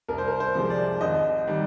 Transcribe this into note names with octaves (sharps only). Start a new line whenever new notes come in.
C2 A#4
C5
A#4
C5
C3 F3 G#3
D5
G#1 D#5
D#3 G3